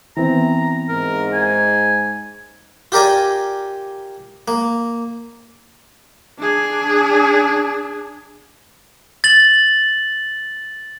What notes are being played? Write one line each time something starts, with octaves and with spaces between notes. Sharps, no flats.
E3 B3 C4 A#5
G#2 A#4
G#5
F4 G4 A#4 D5 G#5
A#3
D4 G#4
A6 F#7